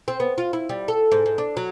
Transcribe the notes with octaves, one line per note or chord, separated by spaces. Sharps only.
C4
B3
F4
E4
G3
A4
G#2
G#2
D4
F#3